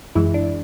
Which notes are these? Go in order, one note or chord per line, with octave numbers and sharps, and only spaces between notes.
F#2 E3 G#3 E4
D4